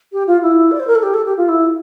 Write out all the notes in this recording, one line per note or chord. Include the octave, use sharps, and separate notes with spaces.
G4
F4
E4
D5
C5
A#4
A4
G4
A4
G4
F4
E4